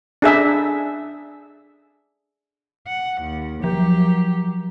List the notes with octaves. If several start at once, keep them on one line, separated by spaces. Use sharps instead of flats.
D4 G#4 E5
F#5
D#2
F3 F#3 G4